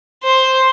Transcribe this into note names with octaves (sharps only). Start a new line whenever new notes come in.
C5